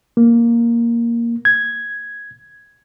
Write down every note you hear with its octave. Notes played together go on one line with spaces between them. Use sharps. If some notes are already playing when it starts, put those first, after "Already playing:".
A#3
G#6